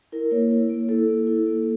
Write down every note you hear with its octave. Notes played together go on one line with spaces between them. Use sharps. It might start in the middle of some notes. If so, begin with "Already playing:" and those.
E4 A#4
A#3 C#5
E4
A#3
E4 A4
A#3
E4
A#3